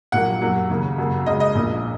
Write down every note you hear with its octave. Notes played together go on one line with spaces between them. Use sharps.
A#1 A#2 F#3 A#3 F#5
F#2 F#3 A#3
D#2 C#3 A#3
F#2 C#3 F#3 A#3
C#2 C#3 G#3 D#5
D#5
A#1 A#2 A#3